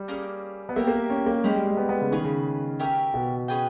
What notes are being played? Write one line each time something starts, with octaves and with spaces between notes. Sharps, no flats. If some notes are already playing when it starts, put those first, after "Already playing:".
Already playing: G3
A#3 C#4 G#4
B3
A#3 G4 A#4 E5
A#3
C#4
A#3
G#3 C#4 E4 G4
G3
G#3
B3
B3
C#3
D#3 C#4 G#4 B4
C#3
C#4 G4 A#4 E5
B2
C#4 G#4 B4 G5